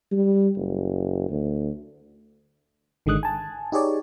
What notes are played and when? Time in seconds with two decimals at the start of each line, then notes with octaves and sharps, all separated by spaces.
0.12 G3
0.57 F#1
1.29 D2
3.06 G#1 D3 D#3 G#3 D#6 F#6
3.23 G#5 A5
3.72 D#4 G4 G#4 C#5 D5